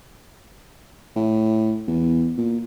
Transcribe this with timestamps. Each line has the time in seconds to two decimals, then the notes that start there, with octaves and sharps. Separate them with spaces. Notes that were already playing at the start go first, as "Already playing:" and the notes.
1.16 A2
1.88 E2
2.38 A#2